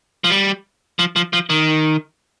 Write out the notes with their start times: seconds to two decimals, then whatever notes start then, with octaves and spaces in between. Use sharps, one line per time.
0.24 F3
0.30 G3
0.99 F3
1.16 F3
1.33 F3
1.50 D#3